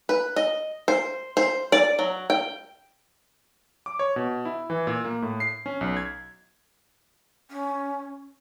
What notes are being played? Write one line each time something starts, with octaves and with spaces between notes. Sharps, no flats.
B4
D#5
C5
C5
D5
F#3
G5
D6
C#5
B2
E4
E3
A#2
A#3
A2
C7
C#4
B1
G#6
C#4